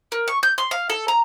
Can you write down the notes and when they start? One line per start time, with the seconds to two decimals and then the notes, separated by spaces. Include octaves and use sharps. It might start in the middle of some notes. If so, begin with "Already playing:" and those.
0.12 A#4
0.28 C#6
0.43 G6
0.58 C6
0.71 F5
0.90 A4
1.08 A#5